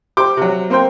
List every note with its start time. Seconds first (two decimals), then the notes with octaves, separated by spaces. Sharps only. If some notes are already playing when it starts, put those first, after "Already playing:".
0.17 G4 C5 D6
0.37 C3 F#3
0.70 A#3 C4 A#4 C5 G5